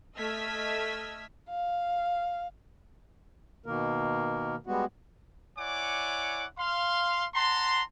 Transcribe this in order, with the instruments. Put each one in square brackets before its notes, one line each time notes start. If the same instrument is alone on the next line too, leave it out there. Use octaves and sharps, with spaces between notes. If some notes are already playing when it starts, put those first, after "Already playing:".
[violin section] A3 D#5 E6 F6 G#6 B6
[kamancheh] F5
[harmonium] B2 D#3 A#3 A#4
G3 G#3 B3 F#4
[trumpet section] E4 C#5 D5 F#5 G#5 D6
F5 C6
F#5 A5 A#5 C6